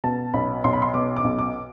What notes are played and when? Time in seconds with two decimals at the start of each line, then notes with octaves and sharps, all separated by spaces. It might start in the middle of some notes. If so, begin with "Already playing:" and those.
0.04 B2 A5
0.34 B1 B5
0.64 B1 C6
0.73 B5
0.82 C6
0.94 B2 D6
1.16 D6
1.24 B1
1.38 D6